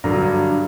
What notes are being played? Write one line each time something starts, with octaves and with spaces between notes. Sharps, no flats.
G2 D3 F#3 A#5